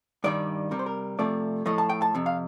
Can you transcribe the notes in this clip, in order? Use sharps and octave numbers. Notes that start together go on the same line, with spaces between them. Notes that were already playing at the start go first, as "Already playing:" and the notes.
G2 D#3 G3 D5
C3 G3 A#4
C5
A#4
C3 F3 A3 D5
A2 F3 A3 D#5
A5
G5
A5
F2 C3
F5